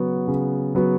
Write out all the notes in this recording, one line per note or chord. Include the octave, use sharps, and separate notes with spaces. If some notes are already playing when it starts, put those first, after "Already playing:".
Already playing: C#3 F#3 B3 F#4
C#3
F#3 B3 F#4